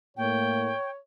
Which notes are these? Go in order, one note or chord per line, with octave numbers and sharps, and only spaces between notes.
A2 A#3 C#5 G5